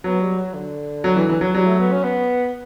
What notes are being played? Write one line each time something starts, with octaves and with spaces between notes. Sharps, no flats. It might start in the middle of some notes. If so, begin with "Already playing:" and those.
F#3 B3
G3
F#3
D3
F#3
E3
E3
F#3
F#3 G3
A3
B3
C#4
B3